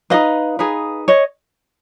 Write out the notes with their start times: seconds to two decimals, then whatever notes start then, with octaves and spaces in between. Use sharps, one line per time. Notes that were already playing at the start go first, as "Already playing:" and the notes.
0.10 D#4 G#4 B4 D#5 F5
0.59 D#4 G#4 B4
1.08 B4 C#5 D#5